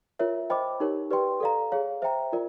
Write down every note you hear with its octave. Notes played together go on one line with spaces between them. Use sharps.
F4 A#4 C#5 E5
C5 D#5 G5 B5 D6
D#4 G4 A#4 C#5
G4 B4 D5 G5 C6
A4 D5 F5 A#5
G#4 C#5 F5
C5 E5 G5 A#5
F4 A#4 D5